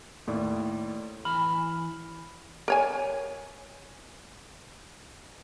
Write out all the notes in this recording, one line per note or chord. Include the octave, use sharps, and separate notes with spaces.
D#2 A2 D5
E3 B5 F6
A#4 C#5 G#5